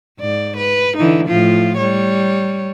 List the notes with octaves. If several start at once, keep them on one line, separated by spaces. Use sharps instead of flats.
G#2 D5
B4
D3 E3 D#4
A2 F3 F4
G3 C#5